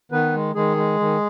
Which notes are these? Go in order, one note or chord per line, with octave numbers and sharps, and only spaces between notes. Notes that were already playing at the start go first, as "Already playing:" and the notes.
D#3 B3 B4
G#3
D#3 G#3 G#4
G#3
D#3